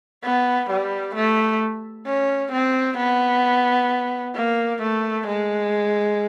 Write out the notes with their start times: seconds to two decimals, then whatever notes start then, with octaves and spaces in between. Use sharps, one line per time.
0.24 B3
0.70 G3
1.15 A3
2.06 C#4
2.52 C4
2.98 B3
4.35 A#3
4.82 A3
5.27 G#3